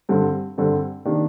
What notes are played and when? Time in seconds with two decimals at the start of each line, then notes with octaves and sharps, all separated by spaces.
0.09 G2 D3 G3 C4
0.58 G2 D3 G3 C4
1.05 C3 D#3 A#3 D4